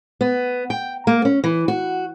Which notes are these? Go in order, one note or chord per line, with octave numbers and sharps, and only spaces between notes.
B3
G5
A#3
C#4
E3
F#4